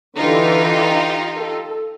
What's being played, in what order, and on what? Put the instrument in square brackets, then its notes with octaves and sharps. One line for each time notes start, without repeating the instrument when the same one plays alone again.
[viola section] D3 E3 [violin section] D#4 F4 G4
[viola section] A4